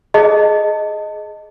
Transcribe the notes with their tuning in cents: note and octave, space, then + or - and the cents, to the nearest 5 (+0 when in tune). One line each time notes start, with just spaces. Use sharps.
G#4 +20 D#5 +0 A5 +25